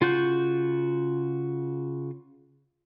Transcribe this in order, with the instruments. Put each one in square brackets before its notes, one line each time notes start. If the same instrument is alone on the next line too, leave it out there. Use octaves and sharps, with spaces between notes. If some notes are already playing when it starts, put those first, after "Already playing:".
[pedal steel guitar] C#3 F4 F#4 G6